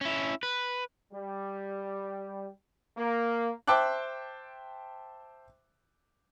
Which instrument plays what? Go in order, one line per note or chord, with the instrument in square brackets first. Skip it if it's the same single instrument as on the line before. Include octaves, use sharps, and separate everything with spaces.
[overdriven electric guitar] C#4 E4
B4
[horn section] G3
A#3
[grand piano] C5 E5 G5 A5 D6 F#6